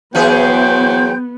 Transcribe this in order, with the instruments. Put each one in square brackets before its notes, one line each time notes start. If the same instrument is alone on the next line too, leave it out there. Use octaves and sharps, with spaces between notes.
[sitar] E3 G#4 B4 [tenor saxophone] F#3 [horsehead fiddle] B3 [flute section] C5 G5 G6